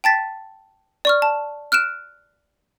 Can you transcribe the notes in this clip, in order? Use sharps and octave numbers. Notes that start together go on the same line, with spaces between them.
G5 A5 A6 B6
D5 C#6 F6
A5
F6 F#6 D7 E7